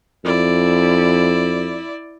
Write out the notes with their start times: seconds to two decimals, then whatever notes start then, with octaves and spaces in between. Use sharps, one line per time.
0.25 F2 E4 D5